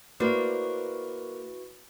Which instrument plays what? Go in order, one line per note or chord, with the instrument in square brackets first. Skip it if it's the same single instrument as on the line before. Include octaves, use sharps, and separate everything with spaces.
[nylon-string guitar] A#3 C5 D5 [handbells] E4 F#4 B4